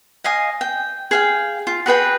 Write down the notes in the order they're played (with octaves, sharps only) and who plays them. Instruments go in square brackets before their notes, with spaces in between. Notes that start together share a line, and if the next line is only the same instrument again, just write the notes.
[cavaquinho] D#5 F5 G#5 D#6
G5
G#4 F5 G5
F4
F#4 G#4 B4 G5